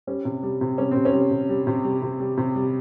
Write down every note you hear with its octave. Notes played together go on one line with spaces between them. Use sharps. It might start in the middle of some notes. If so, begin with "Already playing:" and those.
G3 C#4
C3
G3
C3
G3 C#4
C3 C4
C#4
G3
C3
G3
C3
G3
C3
G3
C3
G3